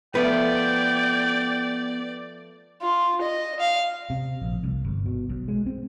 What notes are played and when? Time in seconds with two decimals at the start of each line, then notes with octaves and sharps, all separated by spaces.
0.15 F3 A3 B3 B4 D5 G5
2.82 F4
3.22 D#5
3.60 F5
4.10 C3
4.42 A#1
4.63 C2
4.84 G1
5.06 B2
5.29 B1
5.48 G#3
5.66 C4